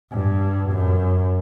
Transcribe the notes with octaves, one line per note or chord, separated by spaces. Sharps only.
G2
F#2